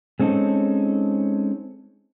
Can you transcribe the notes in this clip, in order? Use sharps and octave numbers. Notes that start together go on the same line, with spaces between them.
G#3 C4 C#4 D#4 A4